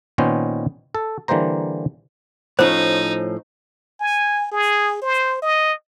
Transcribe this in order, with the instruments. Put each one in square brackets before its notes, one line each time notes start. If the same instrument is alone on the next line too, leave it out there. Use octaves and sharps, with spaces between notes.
[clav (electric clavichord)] A#2 D#3 B3 C#4 C5
A4
D3 E3 G3 A#3 C5 A#5
[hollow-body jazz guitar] A2 F3 C#4 [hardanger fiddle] D#4 [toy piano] C5
[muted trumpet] G#5
G#4
C5
D#5